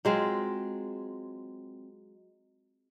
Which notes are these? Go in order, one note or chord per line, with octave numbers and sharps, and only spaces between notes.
F#3 G#3 C4 F4